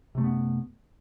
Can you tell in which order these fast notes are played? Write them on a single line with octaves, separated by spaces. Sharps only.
C3 A3 F#2 B3